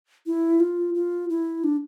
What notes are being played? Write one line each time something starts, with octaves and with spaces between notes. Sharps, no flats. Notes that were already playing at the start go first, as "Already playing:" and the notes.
E4
F4
F4
E4
D4